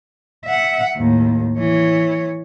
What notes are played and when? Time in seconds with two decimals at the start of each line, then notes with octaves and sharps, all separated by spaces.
0.45 E5 F#5
0.97 D#2 A2
1.58 E3 C#5